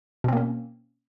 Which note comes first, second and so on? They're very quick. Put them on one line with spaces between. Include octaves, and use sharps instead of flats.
B2 C4 A#3 C#4